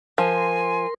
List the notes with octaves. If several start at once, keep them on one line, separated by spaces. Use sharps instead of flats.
F3 A#4 G#5 C6